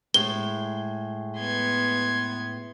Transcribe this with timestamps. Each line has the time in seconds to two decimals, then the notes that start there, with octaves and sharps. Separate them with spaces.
0.14 A2 G#3 G7
1.38 B3 C6 G#6